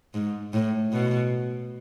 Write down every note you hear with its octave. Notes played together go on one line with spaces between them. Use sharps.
G#2
A2
B2